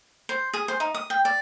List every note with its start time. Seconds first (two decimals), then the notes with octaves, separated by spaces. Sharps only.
0.29 C5
0.54 G#4
0.68 C5
0.80 D#4
0.95 D#6
1.10 G5
1.25 D5